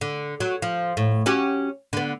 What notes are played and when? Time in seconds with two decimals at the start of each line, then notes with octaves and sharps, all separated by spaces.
0.01 D3
0.40 F#3
0.62 F3
0.97 A2
1.26 C#4 F#4 G4
1.93 D3 B3